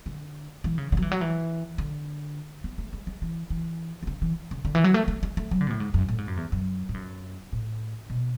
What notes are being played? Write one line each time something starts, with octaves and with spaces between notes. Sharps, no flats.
D3
E3
C#3
D3
F#3
E3
F#3
E3
D3
B3
A3
G#3
G#3
E3
E3
D3
C#3
E3
C#3
D3
E3
F#3
A3
A3
G#3
A3
F#3
D3
B2
A2
G#2
F#2
A2
G#2
F#2
E2
F#2
G#2
F#2
A2
B2